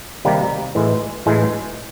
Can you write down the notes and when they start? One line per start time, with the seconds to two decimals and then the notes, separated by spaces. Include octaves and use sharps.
0.25 C3 D#3 G3 A#3
0.75 A2 E3 G#3
1.26 A2 E3 G#3